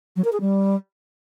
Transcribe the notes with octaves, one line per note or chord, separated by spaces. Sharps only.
F#3
A#4
G#4
G3